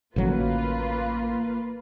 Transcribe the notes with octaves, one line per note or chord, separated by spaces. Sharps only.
A1 D3 F#3 A#3 F4 B4